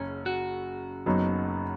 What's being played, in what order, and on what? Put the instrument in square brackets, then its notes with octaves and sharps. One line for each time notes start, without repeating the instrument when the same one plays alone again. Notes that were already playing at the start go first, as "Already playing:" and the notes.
Already playing: [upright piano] F#1 F#2 C#3 [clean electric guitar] C#4
[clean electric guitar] F#4
[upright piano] F#1 F#2 F#3 B3 D#4